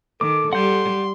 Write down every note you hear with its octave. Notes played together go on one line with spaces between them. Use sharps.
D#3 A4 D6
G3 F#5 C6 G6